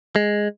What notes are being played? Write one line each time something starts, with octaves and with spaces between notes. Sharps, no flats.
G#3